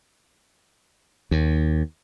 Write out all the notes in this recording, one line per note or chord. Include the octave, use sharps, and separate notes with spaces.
D#2